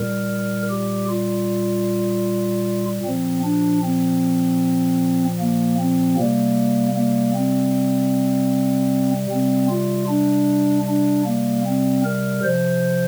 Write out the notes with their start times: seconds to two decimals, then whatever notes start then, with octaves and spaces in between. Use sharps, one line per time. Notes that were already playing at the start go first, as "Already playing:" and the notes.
Already playing: A#2 G3 A#4
0.70 G4
1.09 F4
3.04 A#2 F3 C4
3.44 D4
3.83 C4
5.40 A#3
5.79 C4
6.17 C3 G3 A#3
6.95 A#3
7.34 C4
9.31 C3 G3 C4
9.69 F4
10.08 D4
10.87 D4
11.25 A#3
11.66 C4
12.05 A#4
12.43 C3 F3 C5